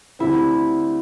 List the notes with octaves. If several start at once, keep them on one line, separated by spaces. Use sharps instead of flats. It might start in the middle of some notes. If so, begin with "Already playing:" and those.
D2 D3 G3 C4 E4